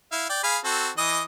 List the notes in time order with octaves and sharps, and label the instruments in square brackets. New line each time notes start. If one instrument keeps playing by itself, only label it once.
[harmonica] E4 F5
D5 G5
G#4 F5 B5
C4 F#4 A4
E3 D#5 D#6